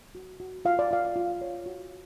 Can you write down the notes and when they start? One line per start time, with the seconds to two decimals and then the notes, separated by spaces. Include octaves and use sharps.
0.15 F#4
0.40 F#4
0.65 F4 F5
0.79 D5
0.91 F4 F5
1.16 F4
1.42 C#5
1.66 F#4